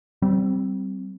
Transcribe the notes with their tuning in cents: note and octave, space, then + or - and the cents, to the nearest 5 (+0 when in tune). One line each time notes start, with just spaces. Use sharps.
G3 -25 C4 +0